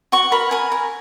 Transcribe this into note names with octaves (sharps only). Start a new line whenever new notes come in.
F#4 C#6
A#4 B5
A#4 G#5
A#4